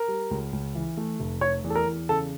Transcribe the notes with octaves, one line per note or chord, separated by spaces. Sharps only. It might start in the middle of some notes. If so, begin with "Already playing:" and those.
Already playing: A#4
G3
C#2
C#2
E3
A3
F1
A3 C#5
E2
A4
A#4
E2
C#3 A4